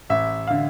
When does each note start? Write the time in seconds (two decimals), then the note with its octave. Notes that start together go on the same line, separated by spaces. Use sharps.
0.10 A1 E5
0.47 D3 F5